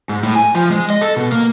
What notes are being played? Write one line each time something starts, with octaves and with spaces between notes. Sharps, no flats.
G#2
A2
G#5
F3
G#3
D#5
A4
B2
A#3